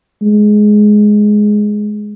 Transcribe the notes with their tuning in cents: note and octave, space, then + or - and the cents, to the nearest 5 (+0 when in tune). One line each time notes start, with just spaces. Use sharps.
G#3 +10